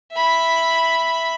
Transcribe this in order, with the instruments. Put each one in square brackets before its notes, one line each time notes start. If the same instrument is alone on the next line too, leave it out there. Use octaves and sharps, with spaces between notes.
[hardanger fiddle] E5 B5